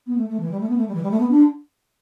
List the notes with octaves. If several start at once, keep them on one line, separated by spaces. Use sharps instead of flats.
B3
A3
A3
E3
G3
A3
B3
A3
G3
E3
G3
A3
B3
D4